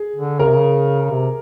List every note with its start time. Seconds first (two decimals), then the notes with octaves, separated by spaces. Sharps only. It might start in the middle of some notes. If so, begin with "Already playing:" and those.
Already playing: G#4
0.16 D3
0.39 C#3 A#4
0.48 C3
0.56 C#3
1.11 C3